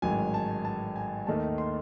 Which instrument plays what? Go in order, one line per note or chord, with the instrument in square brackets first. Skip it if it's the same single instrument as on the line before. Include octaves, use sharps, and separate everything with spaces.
[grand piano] A1 G#2 D#3 F#3 G#5
A5
A5
G#5
D#2 D#3 A3 D#4 A5
C6